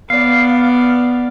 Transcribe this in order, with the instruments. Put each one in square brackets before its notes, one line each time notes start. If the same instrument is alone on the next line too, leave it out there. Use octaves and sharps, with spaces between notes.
[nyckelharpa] B3 D5 [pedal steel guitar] F5